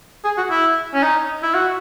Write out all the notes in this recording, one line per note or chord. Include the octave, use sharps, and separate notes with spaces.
G#4
F#4
E4
C#4
D#4
E4
F#4